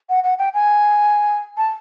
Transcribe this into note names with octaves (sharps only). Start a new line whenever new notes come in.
F#5
F#5
G5
G#5
A5